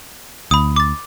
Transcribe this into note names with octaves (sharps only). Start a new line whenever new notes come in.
D2 B5 D#6
D6 A6